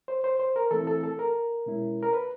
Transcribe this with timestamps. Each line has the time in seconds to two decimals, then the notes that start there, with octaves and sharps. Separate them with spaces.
0.08 C5
0.24 C5
0.40 C5
0.56 A#4
0.71 E3 A3 C4 E4 A4
0.87 A4
1.04 A4
1.19 A#4
1.66 B2 G#3 C#4 E4
2.03 A#4
2.13 B4